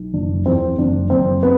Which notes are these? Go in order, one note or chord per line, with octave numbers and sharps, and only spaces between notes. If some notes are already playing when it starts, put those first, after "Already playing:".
Already playing: B1
F#1 D4
E2 C4
F#1 D4
F#1 C4
B3